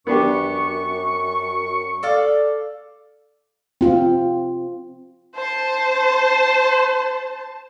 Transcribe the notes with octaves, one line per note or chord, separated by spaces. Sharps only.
F#2 B3 D4 G4 C#6
A4 D5 F5
C4 F4
C5 A5